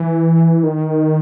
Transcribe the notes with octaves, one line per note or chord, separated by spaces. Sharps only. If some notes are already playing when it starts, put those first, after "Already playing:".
Already playing: E3
D#3